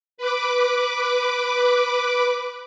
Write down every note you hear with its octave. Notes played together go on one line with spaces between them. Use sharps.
B4 D6